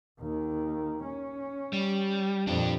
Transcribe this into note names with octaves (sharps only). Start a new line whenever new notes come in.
D#2 D#3
C#4
G3
F2 A#2 D4 G4